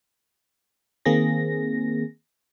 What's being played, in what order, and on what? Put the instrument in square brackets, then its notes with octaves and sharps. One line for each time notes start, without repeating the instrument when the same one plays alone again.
[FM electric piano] D#3 A#3 C4 G#4 A#6